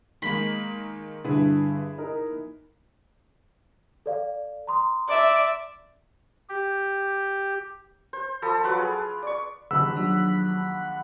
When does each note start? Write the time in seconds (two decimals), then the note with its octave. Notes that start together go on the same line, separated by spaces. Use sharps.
0.22 D#3 G#3 A#3 B5
1.24 G2 D3 E4 G#4 B4
1.98 D#4 A#4
4.06 A4 D5 F5
4.67 A#5 C6 D#6
5.09 D5 E5
6.49 G4
8.13 C5
8.42 F3 A4 B5 D#6
8.64 F#3 F4 B4 D6
8.78 G#4
9.22 D5 C#6
9.71 A#1 D#2 F3 F#5 B5 E6
9.96 F#3 D4